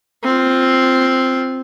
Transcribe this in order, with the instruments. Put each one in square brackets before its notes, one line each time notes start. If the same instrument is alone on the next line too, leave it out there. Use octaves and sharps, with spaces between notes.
[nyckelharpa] C4 F4